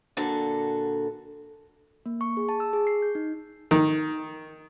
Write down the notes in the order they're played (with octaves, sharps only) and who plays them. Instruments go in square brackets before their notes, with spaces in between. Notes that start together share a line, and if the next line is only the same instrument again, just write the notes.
[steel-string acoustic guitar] A#2 D3 F#4 A4
[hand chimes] A#3
C#6
G#4
A5
E6
G#4
C7
G6
D#4
[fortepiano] D#3